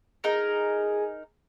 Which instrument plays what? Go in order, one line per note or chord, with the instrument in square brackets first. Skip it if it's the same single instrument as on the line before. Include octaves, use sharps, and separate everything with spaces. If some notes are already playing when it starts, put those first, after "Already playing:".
[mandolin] D#4 A#4 [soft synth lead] G#4